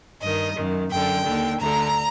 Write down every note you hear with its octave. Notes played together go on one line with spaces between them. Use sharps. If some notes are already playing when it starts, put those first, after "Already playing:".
G2 D#3 D#5
F#2 D#3
F#2 D3 G5
D#2 D3
D2 D3 A#5